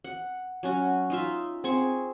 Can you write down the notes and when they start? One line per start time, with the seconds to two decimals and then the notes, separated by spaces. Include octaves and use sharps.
0.04 F#5
0.63 F#3 C#4 F#4
1.10 D#4 F4 E5
1.64 C4 G#4 C#6